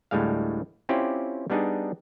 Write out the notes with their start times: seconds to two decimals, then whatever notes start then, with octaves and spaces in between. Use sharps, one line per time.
0.11 D2 A2 G3 G#3 F5
0.89 C4 C#4 E4 F4 G4 D5
1.50 G3 B3 D4 D#4 G#4